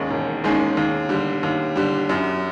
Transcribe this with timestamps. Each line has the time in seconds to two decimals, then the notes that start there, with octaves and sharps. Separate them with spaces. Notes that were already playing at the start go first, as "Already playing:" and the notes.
Already playing: E1 D#2 D#3 G#3 C#4
0.11 E1
0.44 D#2 D#3 G#3 C#4
0.77 D#2
1.09 D3 G3
1.43 D#2
1.76 D3 G3
2.09 F#2